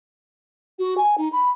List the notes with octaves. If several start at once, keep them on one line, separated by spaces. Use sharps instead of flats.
F#4
G#5
D#4
B5